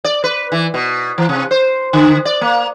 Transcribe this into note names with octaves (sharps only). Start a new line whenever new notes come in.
D5
B4
E3
B2
E3
C3
C5
D3
D5
A#3